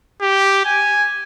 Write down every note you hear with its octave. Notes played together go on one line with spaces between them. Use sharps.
G4
G#5